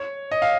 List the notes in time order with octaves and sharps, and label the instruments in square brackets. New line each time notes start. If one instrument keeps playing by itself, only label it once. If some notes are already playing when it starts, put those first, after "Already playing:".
Already playing: [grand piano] C#5
D#5
F5